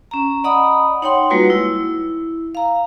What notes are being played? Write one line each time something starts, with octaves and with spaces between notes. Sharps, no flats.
C#4 A#5
D5 D#5 F#5 A#5 B5 D#6
D#4 C#5 F#5 G5 C6
G3 G#3 A#3 F4 F#4 B4
E4
F5 A#5